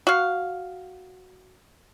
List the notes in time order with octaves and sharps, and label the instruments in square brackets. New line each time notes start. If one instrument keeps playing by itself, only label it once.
[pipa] F#4 F5